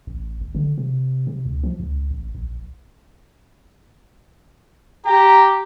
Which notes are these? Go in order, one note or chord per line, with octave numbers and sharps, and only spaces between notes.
A1
G#1
D3
C3
C3
C#2
F3
C#2
A1
A#1
G4 A#5